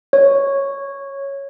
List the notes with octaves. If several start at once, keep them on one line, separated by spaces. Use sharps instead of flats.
C#5